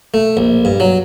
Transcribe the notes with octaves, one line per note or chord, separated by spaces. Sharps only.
A3
A#1
G2
F#3